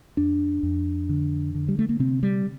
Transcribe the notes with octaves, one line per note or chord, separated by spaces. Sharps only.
F2 D4
F2
D3
D3
G3
A3
A#3
C3 C4
G3